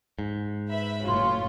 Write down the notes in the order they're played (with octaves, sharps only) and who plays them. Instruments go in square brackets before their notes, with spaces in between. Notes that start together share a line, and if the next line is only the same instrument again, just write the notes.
[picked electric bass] G#2
[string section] B4 E5 B5
[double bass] F#1 A2 [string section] C#4 F4 [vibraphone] F#4 C6